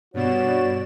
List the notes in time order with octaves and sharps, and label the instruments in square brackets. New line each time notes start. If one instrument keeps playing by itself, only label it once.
[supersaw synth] G2 B2 E7 [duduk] F#4 [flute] C#5 [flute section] D5